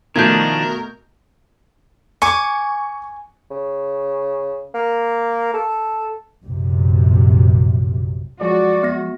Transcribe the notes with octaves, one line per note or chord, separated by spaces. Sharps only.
B2 D#3 F3 A3 D4 A#4 G6 G#6
G#5 C#6 D6 C#7
C#3
A#3
A4
A#1 F#2 C3
F3 F#3 G#3 F#4 D5
B3 A#6